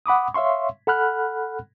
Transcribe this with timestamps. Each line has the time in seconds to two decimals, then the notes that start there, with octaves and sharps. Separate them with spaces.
0.06 F#5 B5 D6 D#6
0.34 C#5 E5 F5 C6 C#6
0.87 A4 F#5 B5 F6 F#6